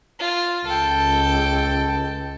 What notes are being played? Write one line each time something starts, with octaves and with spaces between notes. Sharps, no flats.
F4
C#2 A4 G5